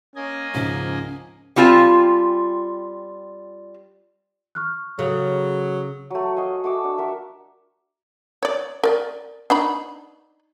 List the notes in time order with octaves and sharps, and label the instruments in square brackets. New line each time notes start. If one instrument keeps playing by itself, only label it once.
[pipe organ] A#3 D#5 G#5 [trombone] C#4
[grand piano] C#2 G#2 [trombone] F3 [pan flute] C#4
[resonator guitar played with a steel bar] G3 C4 F4 G#5 A5
[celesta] C#6 F6 F#6
[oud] C#3 [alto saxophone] F#3 [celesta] A4 F5 F7
[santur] F#3 A3
F#4 D#5 F5 G#5
A3 F#4 D6 E6
D4
F#4 A#4 E5
[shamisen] C#5 D5
A#4 D5
D4 D#4 B5